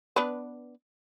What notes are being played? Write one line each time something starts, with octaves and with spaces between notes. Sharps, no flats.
B3 D4 B4